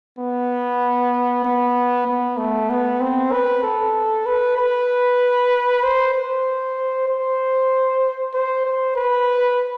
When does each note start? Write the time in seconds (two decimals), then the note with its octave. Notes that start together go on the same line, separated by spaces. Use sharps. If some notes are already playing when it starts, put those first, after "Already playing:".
0.18 B3
1.44 B3
2.07 B3
2.37 A3
2.69 B3
3.00 C4
3.32 B4
3.63 A4
4.26 B4
4.57 B4
5.83 C5
6.14 C5
7.08 C5
8.34 C5
8.65 C5
8.96 B4